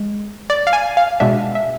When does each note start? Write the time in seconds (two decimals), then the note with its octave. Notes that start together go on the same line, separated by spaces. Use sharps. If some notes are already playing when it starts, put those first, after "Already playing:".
Already playing: G#3
0.50 D5
0.67 F5
0.73 G#5
0.97 F5
1.20 B2 G#3 B3 D4 E5
1.55 E5